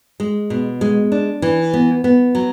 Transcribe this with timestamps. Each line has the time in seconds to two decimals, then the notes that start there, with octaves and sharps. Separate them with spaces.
0.20 G#3
0.50 B2
0.81 G#3
1.12 D4
1.42 E3
1.73 B3
2.04 B3
2.35 F#3